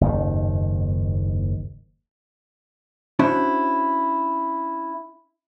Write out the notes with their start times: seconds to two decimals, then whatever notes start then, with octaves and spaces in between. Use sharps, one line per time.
0.01 F#1 D#2 G#2 D#3
3.19 C#4 D4 E4 F#4 C5